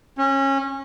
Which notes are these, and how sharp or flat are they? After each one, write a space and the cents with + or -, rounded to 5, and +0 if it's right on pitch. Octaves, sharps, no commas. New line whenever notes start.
C#4 -25